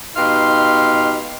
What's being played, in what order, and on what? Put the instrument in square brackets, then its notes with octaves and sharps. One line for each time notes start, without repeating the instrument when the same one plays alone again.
[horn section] B2 D#4 G4 F5 C6